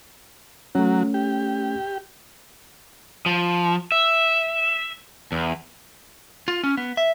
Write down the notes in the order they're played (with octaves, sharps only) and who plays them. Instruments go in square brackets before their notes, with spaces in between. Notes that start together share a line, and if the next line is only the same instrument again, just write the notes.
[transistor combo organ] F#3 [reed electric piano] A3 C#4
[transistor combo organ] G4
[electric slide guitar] F3
E5
E2
[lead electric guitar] F4
C#4
B3
E5